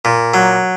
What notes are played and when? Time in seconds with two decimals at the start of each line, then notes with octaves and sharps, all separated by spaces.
0.05 A#2
0.34 F#3